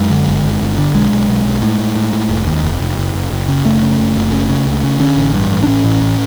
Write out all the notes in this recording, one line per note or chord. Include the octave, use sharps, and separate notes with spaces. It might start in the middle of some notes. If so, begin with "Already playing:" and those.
Already playing: F#2 G#3
D3
G1
G1
G1
D3
B1 G#3
B1
B1
B1
A2
A2
A2
A2
F1
D#2
F1
F1
F#1
F#1
F#1
C#3
F#1 A3
C#3
F#1
F#1
C#3
C#3
C#2
C#3
D3 C#4
A1
G2
A1
D4
A2 C#4
A1
A2